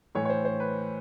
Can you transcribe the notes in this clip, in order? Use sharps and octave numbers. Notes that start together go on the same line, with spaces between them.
A2 E3 C#5
C#5
C5
C5
B4